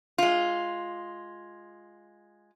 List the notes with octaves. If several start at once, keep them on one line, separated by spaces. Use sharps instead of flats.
G#3 F4